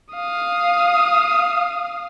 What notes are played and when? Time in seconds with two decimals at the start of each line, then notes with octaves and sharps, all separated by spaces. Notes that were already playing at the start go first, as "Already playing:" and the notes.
0.13 F5 D#6